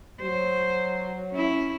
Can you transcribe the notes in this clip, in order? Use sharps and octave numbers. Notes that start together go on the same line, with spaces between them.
F#3 C5
C#4 E4